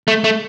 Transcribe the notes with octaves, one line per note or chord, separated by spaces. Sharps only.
A3
A3